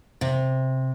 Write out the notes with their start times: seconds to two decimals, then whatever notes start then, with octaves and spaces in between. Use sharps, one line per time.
0.21 C3